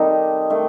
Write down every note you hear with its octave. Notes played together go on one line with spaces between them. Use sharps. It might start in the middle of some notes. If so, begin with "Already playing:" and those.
Already playing: C3 D#3 G3 C4 D#4 G4 A4
D#3 A3